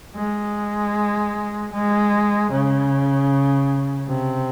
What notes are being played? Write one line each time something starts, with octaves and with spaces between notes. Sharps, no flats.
G#3
G#3
C#3
C3